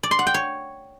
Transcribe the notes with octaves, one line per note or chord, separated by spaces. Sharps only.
D5
C6
F#5
G5
C#5